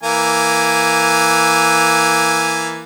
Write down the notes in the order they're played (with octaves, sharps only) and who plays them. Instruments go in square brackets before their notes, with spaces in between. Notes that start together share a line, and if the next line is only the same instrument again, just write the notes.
[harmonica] E3 A#3 G#5